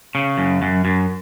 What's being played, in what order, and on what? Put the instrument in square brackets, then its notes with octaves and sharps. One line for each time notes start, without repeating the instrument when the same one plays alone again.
[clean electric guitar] C#3
F#2
F#2
F#2